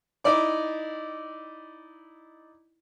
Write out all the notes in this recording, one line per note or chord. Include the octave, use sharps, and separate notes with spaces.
D#4 E4 D5 D6